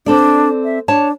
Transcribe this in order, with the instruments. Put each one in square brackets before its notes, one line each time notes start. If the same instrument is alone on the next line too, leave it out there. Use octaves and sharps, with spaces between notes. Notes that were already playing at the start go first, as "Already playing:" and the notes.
[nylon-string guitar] C4 A4 D5 [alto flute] D4
[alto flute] E5
[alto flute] D4 [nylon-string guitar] C#5 A5